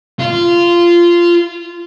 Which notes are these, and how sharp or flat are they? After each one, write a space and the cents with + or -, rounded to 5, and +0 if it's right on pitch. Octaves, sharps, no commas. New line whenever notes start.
F4 -15